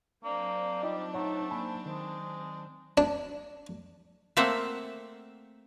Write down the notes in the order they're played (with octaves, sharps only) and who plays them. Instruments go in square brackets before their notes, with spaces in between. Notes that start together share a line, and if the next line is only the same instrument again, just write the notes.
[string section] F#3 C4 D4 [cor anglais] A#3 [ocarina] D5
[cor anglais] G3 [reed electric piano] D#4 F4 D#5
[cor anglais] A3 [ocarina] D#4 [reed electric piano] C#5 F#5 A#5
[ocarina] A#3 [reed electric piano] G#5 A5 B5
[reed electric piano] D#3 [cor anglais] G#3 [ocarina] C5
[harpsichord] D4
[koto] A3 A#3 C4 E5 F#5